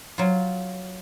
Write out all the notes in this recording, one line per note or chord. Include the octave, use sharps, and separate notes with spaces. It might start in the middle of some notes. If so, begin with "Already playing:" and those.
F#3 F4